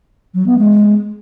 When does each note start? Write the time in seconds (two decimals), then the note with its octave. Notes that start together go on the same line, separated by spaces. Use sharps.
0.34 F#3
0.46 B3
0.58 G#3